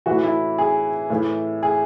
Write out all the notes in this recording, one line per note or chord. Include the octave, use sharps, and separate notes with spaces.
A2 E3 F#4
E4
G#4
A2 E3
G#4